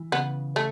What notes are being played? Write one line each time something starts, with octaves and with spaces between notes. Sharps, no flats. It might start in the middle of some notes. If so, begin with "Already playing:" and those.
Already playing: E3
C#3 B3
A3 C#5